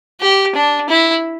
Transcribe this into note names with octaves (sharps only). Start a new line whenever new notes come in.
G4
D4
E4